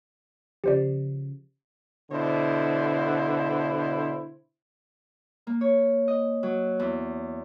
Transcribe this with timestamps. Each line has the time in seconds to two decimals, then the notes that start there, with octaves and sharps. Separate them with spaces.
0.64 C#3 F3 G4 C5 D5
2.10 B2 D3 E4 C5
5.47 A#3
5.61 C#5
6.08 D#5
6.43 F#3
6.79 E2